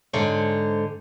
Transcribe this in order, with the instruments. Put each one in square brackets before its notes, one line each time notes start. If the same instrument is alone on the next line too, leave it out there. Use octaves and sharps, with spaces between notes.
[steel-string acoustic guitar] G#2 D3 C5 C#5